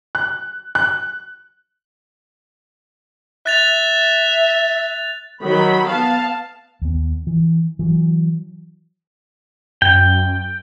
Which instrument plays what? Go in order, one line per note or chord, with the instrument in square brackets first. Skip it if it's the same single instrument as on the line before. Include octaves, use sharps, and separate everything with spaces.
[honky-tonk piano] F#6
F#6
[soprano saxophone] E5 [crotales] F#6 A6 F7
[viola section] D#3 F#3 B5
B3 F5 A5
[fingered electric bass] D#2 B3
E3
E3 F#3
[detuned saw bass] F#2 [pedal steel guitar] G5